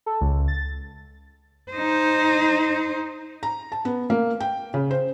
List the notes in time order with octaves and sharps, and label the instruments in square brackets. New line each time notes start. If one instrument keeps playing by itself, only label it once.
[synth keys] A4
C#2
A6
[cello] D#4 C5
[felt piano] A#5
A5
B3
A#3
G5
C#3
C5